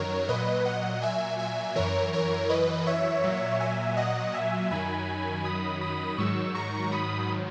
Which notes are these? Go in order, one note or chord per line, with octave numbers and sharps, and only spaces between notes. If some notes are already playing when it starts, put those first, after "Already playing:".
Already playing: F#2 D#3 F#3 A#4 C#5
A#2 F#3 B4 D#5
D#5 F#5
E5 G#5
E5 G#5
F#2 E3 A#4 C#5
A#4 C#5
B4 D#5
C#5 E5
A#2 F#3
E5 G#5
D#5 F#5
E5 G#5
F#2 D#3 F#3 G#5 B5
B5 D#6
B5 D#6
G#2 D#3 F#3 C#6 E6
A#5 C#6
B5 D#6